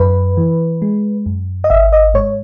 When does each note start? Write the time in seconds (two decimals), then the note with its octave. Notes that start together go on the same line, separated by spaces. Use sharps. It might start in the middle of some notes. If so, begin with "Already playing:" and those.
Already playing: F#2 B4
0.37 E3
0.82 G#3
1.26 F#2
1.64 D#5
1.70 G#1 E5
1.92 D#5
2.14 G#2 C#5